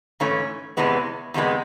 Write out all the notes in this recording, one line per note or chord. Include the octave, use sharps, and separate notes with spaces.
G#2 E3 A3 C#4
E2 C3 E3 G#3 B3
E2 C3 E3 G#3 B3